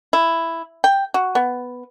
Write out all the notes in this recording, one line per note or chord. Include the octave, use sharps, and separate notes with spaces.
E4
G5
F#4
B3